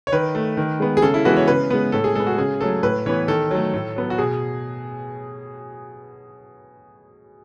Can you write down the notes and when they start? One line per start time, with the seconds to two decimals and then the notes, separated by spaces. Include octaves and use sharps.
0.07 C#5
0.12 D#3 B4
0.35 A3
0.57 D#3
0.80 G#3 B3
0.97 G#4
1.02 C#3 A4
1.14 E4
1.25 E3 G#3 B3 F#4
1.36 C#5
1.48 C#3 B4
1.70 G#3 B3
1.92 A2 A4
2.04 G#4
2.15 G#3 B3 A4
2.27 F#4
2.38 C#3 G#4
2.60 F#3 A3 A4
2.83 A2 B4
3.06 E3 B3 C#5
3.28 D#3 A4
3.51 F#3 A3
3.74 A2
3.96 F#3 B3
4.10 F#4
4.18 B2 G#4